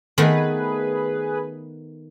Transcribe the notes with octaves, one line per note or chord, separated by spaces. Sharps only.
D#3 A3 B3 G#4 B4